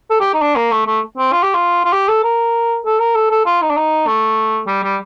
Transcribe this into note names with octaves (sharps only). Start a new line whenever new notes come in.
A4
G4
D#4
D4
A#3
A3
A3
C4
F4
G4
F4
F4
G4
A4
A#4
A4
A#4
A4
A4
F4
D#4
D4
D#4
A3
G3
G3